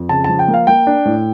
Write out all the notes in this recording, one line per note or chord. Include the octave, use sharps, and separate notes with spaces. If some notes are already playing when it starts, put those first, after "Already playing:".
Already playing: F2
C#3 A5
F3 A5
G5
A#3
F5
A#3 G5
D4
A2